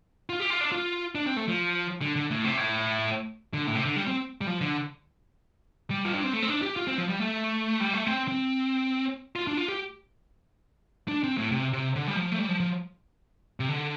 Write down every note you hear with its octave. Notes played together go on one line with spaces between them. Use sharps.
F4
G4
F4
D4
F4
D4
C4
A3
F3
D3
D3
A2
C3
A2
D3
A2
C3
D3
G3
C4
G3
F3
D3
G3
F4
D4
C4
A3
C4
D4
G4
F4
C4
F3
G3
A3
G3
A3
C4
C4
F4
D4
F4
G4
D4
C4
A2
C3
C3
D3
G3
F3
A3
G3
F3
F3
C3
D3